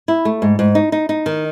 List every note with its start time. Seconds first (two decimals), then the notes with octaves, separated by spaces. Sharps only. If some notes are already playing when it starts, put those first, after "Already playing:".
0.08 E4
0.25 A3
0.42 G#2
0.59 G#2
0.75 D#4
0.92 D#4
1.09 D#4
1.26 D#3